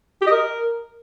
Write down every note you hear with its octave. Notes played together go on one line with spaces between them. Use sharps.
G4
D#5
A#4